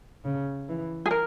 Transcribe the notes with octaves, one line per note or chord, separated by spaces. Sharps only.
C#3
E3
G#4
A#4